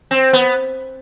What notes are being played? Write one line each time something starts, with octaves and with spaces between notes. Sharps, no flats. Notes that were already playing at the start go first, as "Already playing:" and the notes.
C4
B3